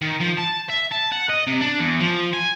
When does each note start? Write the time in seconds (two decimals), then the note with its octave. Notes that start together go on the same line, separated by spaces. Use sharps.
0.02 D#3
0.21 F3
0.38 A5
0.70 E5
0.92 A5
1.12 F#5
1.29 D#5
1.47 C3
1.61 D4
1.79 E2
2.00 F3
2.33 G#5